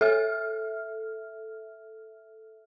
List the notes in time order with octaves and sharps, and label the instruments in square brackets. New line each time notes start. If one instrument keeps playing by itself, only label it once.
[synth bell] A4 E5 F6